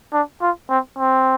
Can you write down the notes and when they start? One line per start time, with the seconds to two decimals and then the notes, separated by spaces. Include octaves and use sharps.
0.13 D4
0.42 F4
0.70 C4
0.99 C4